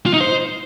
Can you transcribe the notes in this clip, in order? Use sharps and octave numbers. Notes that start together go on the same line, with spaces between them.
F4
D#4
C5